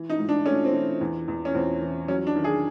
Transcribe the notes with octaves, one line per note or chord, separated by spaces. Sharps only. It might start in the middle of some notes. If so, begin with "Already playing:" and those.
Already playing: E3
D#4
G#2
D4
A3 C#4
C4
E3
E2
E2
C#4
E2 C4
E3
F#3 C#4
D4
D#3
G#4